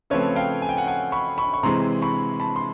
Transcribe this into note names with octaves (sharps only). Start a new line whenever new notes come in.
C#3 F3 A3 C4 B4 C#5
F5 G5
G#5
G5
F#5 G#5
F#5 G#5
B5 C#6
B5 C#6
C#6
C3 E3 G#3 C4 A#5 C6
B5 C#6
A5 B5
C6